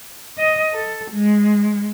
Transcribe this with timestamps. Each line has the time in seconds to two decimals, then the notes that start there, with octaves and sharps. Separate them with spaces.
0.38 D#5
0.73 A4
1.12 G#3